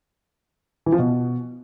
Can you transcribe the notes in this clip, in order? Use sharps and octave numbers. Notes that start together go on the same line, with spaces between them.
E3
F3
B2